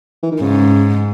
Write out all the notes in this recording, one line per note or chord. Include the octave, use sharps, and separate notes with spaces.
E3
D#3
G#2 C#3